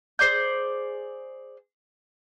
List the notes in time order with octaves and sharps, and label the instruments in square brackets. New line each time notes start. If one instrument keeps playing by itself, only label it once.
[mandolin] G#4 C5 D5 G6